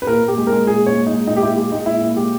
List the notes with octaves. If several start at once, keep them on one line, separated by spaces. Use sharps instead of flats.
B4
A#2 A#4
A#2 G4
G#3
A#4
G#3
A#2 G#4
A#2 C#5
G#3
D#4
G#3
A#2 D#4
G4
A#2 E4
G#3 G4
G#3 D#4
A#2 E4
A#2
G#3 G4